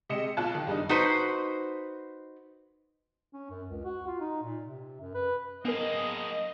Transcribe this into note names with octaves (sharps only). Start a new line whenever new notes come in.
C3 G#3 D#5 C#7 E7
B1 F4 F5 A5 F#6
D#3
F#1 G3 D4 D#4
D#4 F#4 B4 C5
C#4
F#2
C#2
F#4
F4
D#4
A#2
C3
F#2
B4
A#3 B3 G#4 A#4 D#5